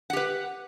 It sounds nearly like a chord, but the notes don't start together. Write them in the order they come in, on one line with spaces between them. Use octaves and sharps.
F#5 G4 B4